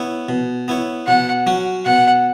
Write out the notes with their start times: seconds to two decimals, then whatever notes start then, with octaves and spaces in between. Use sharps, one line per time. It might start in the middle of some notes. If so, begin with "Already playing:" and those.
Already playing: B3 E4 C#5
0.29 B2
0.68 B3 E4 C#5
1.07 B2 F#5
1.47 F#3 C#4 F#4
1.85 B2 F#5